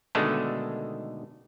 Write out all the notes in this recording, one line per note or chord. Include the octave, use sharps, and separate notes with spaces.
B2 D3 D#3 G#3 A3